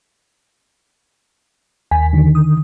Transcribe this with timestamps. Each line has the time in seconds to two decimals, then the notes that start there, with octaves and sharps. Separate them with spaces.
1.91 D#2 G#5 B6
2.13 D3 D#3
2.35 D#6